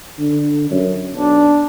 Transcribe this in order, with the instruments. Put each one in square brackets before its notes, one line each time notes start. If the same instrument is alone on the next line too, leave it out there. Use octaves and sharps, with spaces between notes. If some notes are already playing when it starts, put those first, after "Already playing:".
[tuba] D3
F#2
[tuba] B1 [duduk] D4